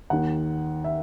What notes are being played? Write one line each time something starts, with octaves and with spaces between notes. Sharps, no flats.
D#2 D#3 F#5
E5